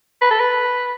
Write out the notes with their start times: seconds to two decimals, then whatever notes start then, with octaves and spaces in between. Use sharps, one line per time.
0.21 B4
0.31 A4
0.40 B4